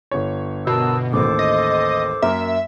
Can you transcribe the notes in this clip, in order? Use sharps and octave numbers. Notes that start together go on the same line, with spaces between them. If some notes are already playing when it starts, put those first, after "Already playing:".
G1 C#5
B2 A#4 A5 E6
A1 D#2 A4 C5 D6
D#5
F#2 A#3 A#4 E5